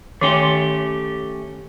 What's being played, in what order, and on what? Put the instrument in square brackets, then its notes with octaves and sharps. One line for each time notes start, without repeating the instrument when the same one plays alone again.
[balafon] D#3 C6 [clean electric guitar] A3 C#4 G4